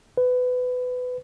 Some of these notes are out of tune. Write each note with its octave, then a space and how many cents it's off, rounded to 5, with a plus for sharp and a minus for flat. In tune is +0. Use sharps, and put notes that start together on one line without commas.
B4 +20